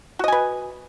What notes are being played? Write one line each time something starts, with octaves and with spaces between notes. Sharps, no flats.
F#4 B4 D#5 G#5